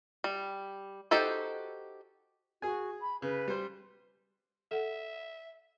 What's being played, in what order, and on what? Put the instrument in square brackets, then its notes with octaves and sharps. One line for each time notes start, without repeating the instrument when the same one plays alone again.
[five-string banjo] G3
D#4 F#4 G4 A4 C5
[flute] F#4 [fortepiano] G#4 G#5
[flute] B5
[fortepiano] C#3 [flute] B4
[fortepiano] G3 C5
[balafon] A4 F#5 [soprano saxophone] E5